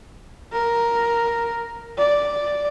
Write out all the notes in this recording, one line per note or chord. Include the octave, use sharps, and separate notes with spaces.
A#4
D5